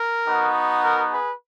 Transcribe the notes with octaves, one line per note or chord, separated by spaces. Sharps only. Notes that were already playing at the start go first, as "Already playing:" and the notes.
Already playing: A#4
B3 D#4 F#4
A#4
G#4 B4